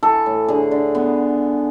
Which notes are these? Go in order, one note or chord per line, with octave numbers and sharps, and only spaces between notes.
E3 A4
A2
D3 G#4
D3
B3